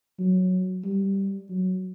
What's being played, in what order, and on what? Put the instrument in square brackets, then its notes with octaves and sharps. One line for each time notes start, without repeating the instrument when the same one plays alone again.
[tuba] F#3
G3
F#3